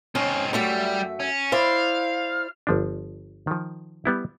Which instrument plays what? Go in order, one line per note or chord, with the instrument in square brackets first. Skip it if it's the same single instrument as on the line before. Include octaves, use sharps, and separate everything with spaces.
[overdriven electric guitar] C4 D#4 [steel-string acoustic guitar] C#4
[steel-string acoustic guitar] F#2 A3 E5 [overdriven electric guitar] G3
[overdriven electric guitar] C#4
[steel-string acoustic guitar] E4 C5 D5 [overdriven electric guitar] F5
[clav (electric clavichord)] G1 F3 D4
D#3 F3
G3 B3 E4